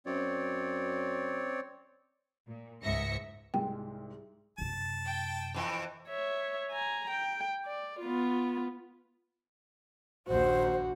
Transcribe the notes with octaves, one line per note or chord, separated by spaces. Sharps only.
F#2 C4 C#5 D5
A#2
C#2 G#2 E5 A#6 C#7
C2 G#2 G#3 G5
F#2 C3 A5
G5
F2 E3
C#5 E5
G#5 A#5
G5
D5
B3 F4
A#1 D#2 F#4 C5